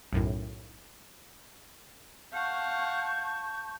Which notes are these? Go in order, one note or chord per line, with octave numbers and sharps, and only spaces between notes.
B1 F#2 A2
F5 F#5 A5 C#6 G6